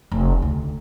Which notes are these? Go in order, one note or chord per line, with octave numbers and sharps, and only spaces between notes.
F1
D2